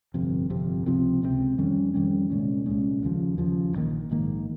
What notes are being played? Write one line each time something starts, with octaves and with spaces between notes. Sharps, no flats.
G1 F2 C3
G1 F2 C3
C#2 C3 F3 C4
C#2 C3 F3 C4
F2 D#3 G3 C#4
F2 D#3 G3 C#4
C2 A#2 G#3 C#4
C2 A#2 G#3 C#4
D#2 C#3 F3
D#2 C#3 F3
A#1 G#2 D#3 A#3
A#1 G#2 D#3 A#3